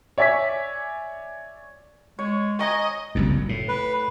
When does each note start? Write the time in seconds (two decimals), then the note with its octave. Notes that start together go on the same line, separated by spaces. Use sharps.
0.18 C#5 D5 E5 G#5 C#6 B6
2.19 G#3 C#5
2.59 D#5 G#5 A#5 C#6
3.15 F#1 C2 F#2
3.49 A2
3.68 B4